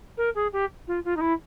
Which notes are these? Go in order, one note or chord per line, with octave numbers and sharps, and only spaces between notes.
A#4
G#4
G4
F4
F4
D#4
E4